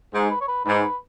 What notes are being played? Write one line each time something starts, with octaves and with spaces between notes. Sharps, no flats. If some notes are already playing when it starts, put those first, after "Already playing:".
G#2 G#4
B4
C#5
B4
G#2 B4
B4